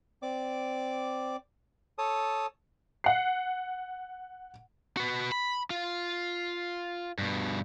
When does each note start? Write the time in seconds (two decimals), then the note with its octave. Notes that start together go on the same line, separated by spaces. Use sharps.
0.22 C4 D5 D6
1.98 A4 C#5 A5 D#6
3.04 F#5 C7
4.97 F#4 B4
5.32 B5
5.70 F4
7.19 G2 B2